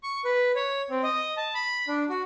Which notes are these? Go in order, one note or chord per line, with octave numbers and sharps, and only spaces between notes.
C#6
B4
C#5
C4
D#5
A5
B5
D4
F#4